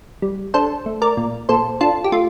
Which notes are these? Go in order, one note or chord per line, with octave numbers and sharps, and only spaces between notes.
G3
D4 A4 C5
A3
A#4 D5
A#2
A#2 A4 C5
D4 F4 A4
G4
A3 F4